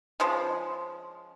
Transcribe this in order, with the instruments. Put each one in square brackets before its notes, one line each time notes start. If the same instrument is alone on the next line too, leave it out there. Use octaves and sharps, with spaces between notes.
[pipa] C#3 F3 G#3